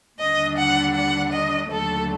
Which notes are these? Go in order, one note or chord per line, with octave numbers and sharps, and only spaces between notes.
D#2 D3 G3 D4 D#5
F#5
F#5
D#5
D#2 D3 F#3 A3 A4